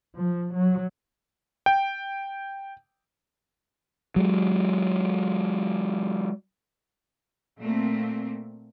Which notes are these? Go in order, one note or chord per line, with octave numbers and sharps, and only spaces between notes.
F3
F#3
G5
F#3 G#3
A#2 A3 A#3 C4